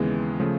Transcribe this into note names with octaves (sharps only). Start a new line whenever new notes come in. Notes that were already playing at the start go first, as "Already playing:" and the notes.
Already playing: D#2 C#3 E3 G#3 B3
C#3 F3 A3